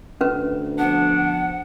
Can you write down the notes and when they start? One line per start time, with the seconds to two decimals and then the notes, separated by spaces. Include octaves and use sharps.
0.21 D2 C#4 B4
0.78 F3 B3 D4 F#5